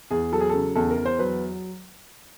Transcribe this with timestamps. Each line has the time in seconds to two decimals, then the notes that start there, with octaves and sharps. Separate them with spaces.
0.11 E2 G#4
0.32 F#3 A4
0.41 G#4
0.49 C#3 A4
0.75 E2 A4
0.90 A#4
0.97 E2
1.06 C5
1.19 F#3 B4